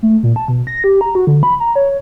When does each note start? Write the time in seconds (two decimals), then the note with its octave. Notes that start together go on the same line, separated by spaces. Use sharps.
0.03 A3
0.23 A#2
0.36 A5
0.48 B2
0.67 A#6
0.84 G4
1.01 A#5
1.15 F#4
1.27 D3
1.43 B5
1.60 A#5
1.76 C#5